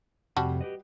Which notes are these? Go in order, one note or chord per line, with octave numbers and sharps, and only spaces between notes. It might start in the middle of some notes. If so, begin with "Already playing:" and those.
F2 C3 G3 F#4 A5
G4 B4 D#5